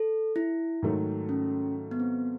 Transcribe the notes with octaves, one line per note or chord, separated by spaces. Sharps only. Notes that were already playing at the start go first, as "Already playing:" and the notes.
Already playing: A4
E4
G#2 D#3 F#3 A3
C#4
B3
C4